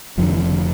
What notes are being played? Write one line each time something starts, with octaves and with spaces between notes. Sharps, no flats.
F1 F2 D3 F3
E3
D3